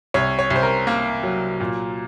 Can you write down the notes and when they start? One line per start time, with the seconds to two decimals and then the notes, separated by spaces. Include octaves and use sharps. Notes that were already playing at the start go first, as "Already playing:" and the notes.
0.14 C2 C#5
0.39 C#5
0.50 C2
0.56 C5
0.63 A#4
0.87 A#3
1.23 F#3
1.60 A#2